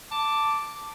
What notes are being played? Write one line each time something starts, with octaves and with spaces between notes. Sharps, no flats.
A5 D6